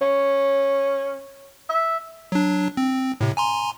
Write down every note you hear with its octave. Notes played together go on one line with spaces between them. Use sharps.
C#4
E5
F#3 D4
C4
A2 C3
G#5 A#5 C6